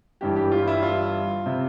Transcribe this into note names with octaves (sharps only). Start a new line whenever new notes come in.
G1 G2 E3 G3 G4
G4
F4
E4
F4
C3